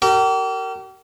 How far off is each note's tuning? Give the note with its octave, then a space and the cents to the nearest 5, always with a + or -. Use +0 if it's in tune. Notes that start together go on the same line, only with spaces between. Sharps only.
G4 -40 A#4 -25